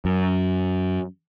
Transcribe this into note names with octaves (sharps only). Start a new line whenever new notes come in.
F#2